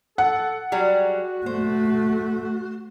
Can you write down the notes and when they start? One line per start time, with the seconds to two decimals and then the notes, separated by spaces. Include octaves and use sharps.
0.18 A4 F#5
0.72 F#3 G3 F#4 G#4
1.46 A3 C5